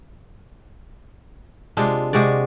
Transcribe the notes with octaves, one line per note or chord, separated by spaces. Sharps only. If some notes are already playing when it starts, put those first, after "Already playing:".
C3 G#3 D4 F4
C3 G#3 F#4 D5